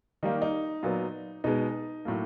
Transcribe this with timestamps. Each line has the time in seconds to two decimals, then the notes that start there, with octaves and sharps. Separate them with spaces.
0.23 D#3 G3 A#3 D#4
0.42 D#4
0.83 A#2 F#3 B3
1.44 B2 G#3 B3 D#4
2.05 A2 F#3 A#3